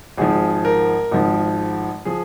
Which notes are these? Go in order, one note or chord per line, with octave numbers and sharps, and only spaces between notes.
G#1 G#2 F3 G#4
A#4
G#1 G#2 F3
F3 G#4